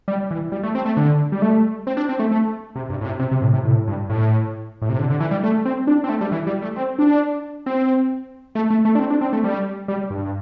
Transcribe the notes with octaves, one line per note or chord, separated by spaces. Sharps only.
G3
E3
G3
A3
C4
A3
D3
G3
A3
C4
D4
C4
A3
A3
C3
G2
A2
C3
C3
C3
A2
C3
A2
G2
A2
A2
C3
D3
D3
E3
G3
A3
C4
D4
C4
A3
G3
E3
G3
A3
C4
D4
C4
A3
A3
A3
D4
C4
D4
C4
A3
G3
G3
G2